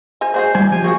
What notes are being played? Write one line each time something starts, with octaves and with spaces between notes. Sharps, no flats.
C5 D#5 G#5
G#3 F#4 G#4 C5
G3 E4 G#5
F3 G4 C5 G#5
A#3 C#4 F#4 G#4